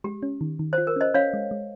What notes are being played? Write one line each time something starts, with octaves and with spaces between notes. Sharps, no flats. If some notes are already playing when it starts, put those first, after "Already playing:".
G#3 G4
C#4
D#3
D#3
F4 C5
A#4
C#4 C5 D#5
C#4 C#5 F5
G#3
G#3